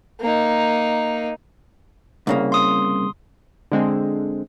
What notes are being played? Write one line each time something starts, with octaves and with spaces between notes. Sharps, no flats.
A#3 D#4
C2 C#3 A#3
C6 D#6
D3 G#3 C4